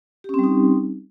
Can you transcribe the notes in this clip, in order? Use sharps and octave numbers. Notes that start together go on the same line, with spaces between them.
G3 C4 C#4 D#4 G4